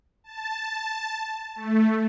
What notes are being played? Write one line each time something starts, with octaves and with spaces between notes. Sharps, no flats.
A5
A3